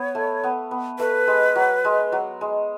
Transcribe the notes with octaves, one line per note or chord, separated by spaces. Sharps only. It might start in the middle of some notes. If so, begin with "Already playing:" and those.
Already playing: B3 C#5
A3
B3
B3
A3 B4
G#3
F#3
G#3
F#3
G#3